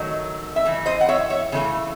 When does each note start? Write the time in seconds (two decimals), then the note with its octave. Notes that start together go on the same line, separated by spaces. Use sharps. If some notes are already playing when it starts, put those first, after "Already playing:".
Already playing: D#3 F#3 A3 D#4
0.56 E5
0.66 C#3 E3
0.86 C5 D#5
1.01 F#5
1.09 C#5 E5
1.30 C#5 E5
1.52 C#3 E3 A3